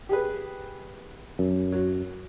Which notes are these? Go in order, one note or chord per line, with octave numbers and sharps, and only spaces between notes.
G4 G#4 B4
F#2
F#3